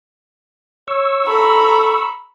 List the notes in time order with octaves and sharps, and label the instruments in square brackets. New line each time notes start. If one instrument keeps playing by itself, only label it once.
[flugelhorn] C#5 [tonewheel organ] C#6 E6
[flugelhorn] A4 [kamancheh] A#5 B5